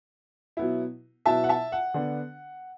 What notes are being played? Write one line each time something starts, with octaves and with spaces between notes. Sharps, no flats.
B2 F#3 B3 E4
B2 F#3 B3 E4 E5 A5
F#5
E5 A5
F#5
D3 B3 D4